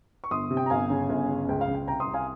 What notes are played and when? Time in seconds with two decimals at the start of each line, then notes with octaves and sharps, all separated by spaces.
0.24 C#6
0.31 G1 C6 D#6
0.51 C3
0.57 G5
0.66 A#5
0.70 G1 F5 G#5
0.90 C#3
1.09 G1
1.28 C#3
1.49 C#2 G5
1.61 F5
1.68 C#2
1.75 G5
1.88 C2 G5 A#5
2.00 C6 D#6
2.07 C2
2.14 F5 G#5